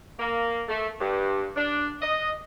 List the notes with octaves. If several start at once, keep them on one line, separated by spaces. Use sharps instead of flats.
A#3
A3
G2
D4
D#5